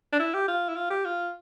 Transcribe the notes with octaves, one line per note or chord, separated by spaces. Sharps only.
D4
E4
G4
F4
E4
F4
G4
F4